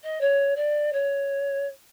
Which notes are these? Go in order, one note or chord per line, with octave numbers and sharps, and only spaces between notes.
D#5
C#5
D5
C#5